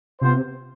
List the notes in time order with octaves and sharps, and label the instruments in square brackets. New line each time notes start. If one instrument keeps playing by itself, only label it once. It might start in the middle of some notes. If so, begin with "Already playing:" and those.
[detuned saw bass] C3 [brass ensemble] B3 F4 C5